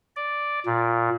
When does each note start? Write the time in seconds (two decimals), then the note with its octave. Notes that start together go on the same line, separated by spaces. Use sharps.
0.16 D5
0.66 A#2